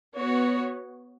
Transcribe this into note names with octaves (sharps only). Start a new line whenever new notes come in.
B3 F#4 C#5